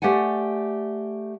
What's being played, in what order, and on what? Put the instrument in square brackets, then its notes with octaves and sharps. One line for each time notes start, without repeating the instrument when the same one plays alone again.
[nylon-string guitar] A3 G4 D5 F#5 G#5